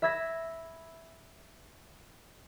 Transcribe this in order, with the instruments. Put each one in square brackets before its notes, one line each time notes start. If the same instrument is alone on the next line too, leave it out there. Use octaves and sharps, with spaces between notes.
[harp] E5 B5 E6 G#6 A#6 B6